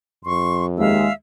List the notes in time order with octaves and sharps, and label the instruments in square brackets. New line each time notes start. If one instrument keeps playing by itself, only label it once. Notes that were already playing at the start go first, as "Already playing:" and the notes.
[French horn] F2 [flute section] C6 C#6
[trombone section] D#2 G#3 [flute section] E5 F5 E6